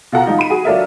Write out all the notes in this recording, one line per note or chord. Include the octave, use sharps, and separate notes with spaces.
B2 F4 A4 F#5 A5 A#5
F3 G3 D#4 F4
B5 D#7
F#4 G#4
F#3 D4 F4 A4 A#4 E5